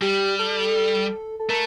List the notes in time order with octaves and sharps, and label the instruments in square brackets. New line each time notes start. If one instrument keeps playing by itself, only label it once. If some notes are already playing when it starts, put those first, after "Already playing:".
[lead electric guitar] G3 [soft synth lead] G4
[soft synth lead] A4
A4
[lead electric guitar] A3 [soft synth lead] A#4